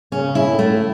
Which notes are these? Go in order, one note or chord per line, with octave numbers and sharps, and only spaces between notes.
C#3 C#4
E4
A2
A3